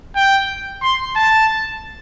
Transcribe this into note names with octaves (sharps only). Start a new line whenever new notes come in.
G5
C6
A5